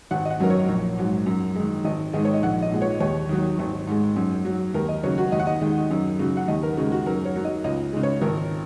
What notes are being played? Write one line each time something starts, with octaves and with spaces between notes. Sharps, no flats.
G#1 F#5
D#5
F#5
F#2 F#3 A#4
C#5
A#1
G#2 F#3
F#2
D#3 G#3
G#1 D#5
G#2 D#3 G#3 D#5
C#5
D#5
A#1 F#5
D#5
A#2 G#3
C#5
D#2 C#5
D#3 F#3
G#1
G#2 G#3
F#2
F#3
D#2 A#4
D#5
C#3 F#3 C#5
F#4
D#2 D#5
F#5
D#5
D#3 G#3
F#2
C#3 F#3
F#5
D#2 D#5
A#4
C#3 G#3 F#4
F#4
F#2 A#4
C#5
F#3
D#5
C#2 D#5
C#3 G#3
C#5
G#1 A#4